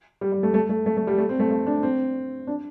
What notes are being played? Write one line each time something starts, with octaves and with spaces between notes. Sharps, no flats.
G3
G3
A3
A3
A3
A3
A3
G3
A3
C4
A3
A3
D4
C4
D4